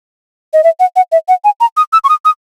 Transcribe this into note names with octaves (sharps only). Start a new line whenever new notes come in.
D#5
E5
F#5
F#5
E5
F#5
G#5
A#5
D#6
E6
C#6
D#6
D#6